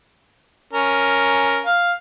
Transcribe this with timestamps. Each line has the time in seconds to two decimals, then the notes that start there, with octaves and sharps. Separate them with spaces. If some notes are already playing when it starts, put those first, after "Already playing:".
0.73 C#4 A#4
1.66 F5